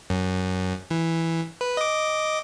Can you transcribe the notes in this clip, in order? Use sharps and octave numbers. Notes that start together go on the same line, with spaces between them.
F#2
E3
B4
D#5 D6